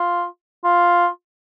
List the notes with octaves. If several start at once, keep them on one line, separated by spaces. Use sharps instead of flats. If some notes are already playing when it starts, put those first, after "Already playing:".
Already playing: F4
F4